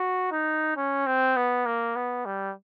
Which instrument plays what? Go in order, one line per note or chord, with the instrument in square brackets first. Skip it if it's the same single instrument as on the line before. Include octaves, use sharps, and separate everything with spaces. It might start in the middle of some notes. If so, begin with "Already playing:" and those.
Already playing: [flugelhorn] F#4
D#4
C#4
C4
B3
A#3
B3
G3